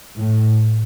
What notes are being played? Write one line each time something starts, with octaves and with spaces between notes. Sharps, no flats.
A2